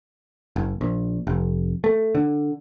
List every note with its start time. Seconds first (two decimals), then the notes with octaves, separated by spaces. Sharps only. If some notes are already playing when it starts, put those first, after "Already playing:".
0.56 F#1
0.81 A#1
1.27 F1
1.84 A3
2.15 D3